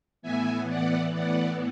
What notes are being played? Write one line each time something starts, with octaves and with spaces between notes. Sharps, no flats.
A2 E3 B3 E5 G#5
D5 F#5
D5 F#5